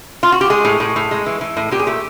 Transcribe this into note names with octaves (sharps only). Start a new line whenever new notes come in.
F4
F#4
G4
G#3 G#4
A2
A2
A2
G#3
E3
E3
A2
A#2 G4
G#4
A3 G4